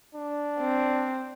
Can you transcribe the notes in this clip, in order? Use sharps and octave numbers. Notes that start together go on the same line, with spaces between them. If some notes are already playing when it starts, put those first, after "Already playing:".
D4
C4